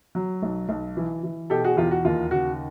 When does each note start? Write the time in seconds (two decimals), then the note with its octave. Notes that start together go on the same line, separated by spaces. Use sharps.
0.15 F#3
0.42 B1
0.69 B1
0.97 E3
1.23 E3
1.50 B2 G4 A4
1.64 F#4 G#4
1.77 E2 F4 G4
1.91 F#4
2.05 D#2 F4
2.31 C#3 F#4